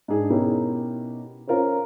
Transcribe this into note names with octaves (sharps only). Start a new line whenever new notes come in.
G#2 D4 G#4
B2 C#4 D#4 E4 G4 A#4
C#4 F4 A#4 C5 C#5